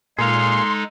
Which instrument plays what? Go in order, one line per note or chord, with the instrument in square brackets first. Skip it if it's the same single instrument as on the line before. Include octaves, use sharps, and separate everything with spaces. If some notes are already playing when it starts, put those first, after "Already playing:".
[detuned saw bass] A#2 [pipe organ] G#3 D#4 A4 [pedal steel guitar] G#4 F5 [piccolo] C6